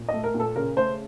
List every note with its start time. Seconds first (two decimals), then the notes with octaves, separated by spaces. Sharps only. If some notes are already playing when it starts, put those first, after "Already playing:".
Already playing: A#2
0.09 A3 D#5
0.24 A#4
0.34 A#2
0.40 A4
0.56 C#3 A#4
0.76 A3 C5